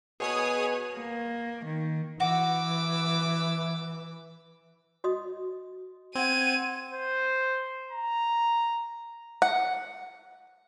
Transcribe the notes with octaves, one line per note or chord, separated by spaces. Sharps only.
B2 G#4 B4 C#5 G#5 D#6
A#3
D#3
E3 F#4 D6 E6
F#4 D#5 D#6
C4 F#5 G#6 D#7
C5
A#5
F#5